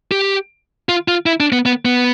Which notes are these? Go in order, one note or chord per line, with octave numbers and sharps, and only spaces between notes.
G4
F4
F4
E4
D4
B3
B3
B3